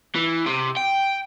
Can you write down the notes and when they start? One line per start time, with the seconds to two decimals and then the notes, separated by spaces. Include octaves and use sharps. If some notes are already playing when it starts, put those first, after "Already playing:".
0.15 E3
0.46 C3
0.77 G5